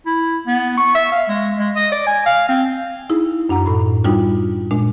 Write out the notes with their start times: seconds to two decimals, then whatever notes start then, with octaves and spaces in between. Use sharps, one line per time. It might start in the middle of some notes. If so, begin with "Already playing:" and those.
0.06 E4
0.47 B3
0.77 C#6
0.95 E5
1.12 F5
1.28 G#3
1.59 G#3
1.76 D#5
1.92 D5
2.07 G#5
2.26 F5
2.49 C4
3.10 D#4 E4 G#4
3.49 F#2 D4 F#5 A#5
3.66 A2 B5
4.04 G3 D4 D#4 F4 F#4
4.71 A#2 G#3 D4